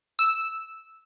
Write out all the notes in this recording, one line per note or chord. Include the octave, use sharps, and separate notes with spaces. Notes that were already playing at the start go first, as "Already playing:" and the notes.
E6